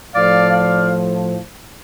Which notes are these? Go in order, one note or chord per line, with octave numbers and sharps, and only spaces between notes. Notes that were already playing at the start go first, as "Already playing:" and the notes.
A2 F3 D5 F5
D5 F5